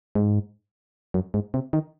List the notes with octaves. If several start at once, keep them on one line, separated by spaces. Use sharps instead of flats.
G#2
F#2
G#2
C3
D#3